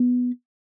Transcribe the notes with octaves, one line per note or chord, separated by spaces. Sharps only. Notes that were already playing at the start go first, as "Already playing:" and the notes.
Already playing: B3